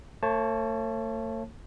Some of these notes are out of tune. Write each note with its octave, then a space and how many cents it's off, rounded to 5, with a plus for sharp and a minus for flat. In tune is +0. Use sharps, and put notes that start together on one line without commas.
A3 +45 C#5 -35 A5 -10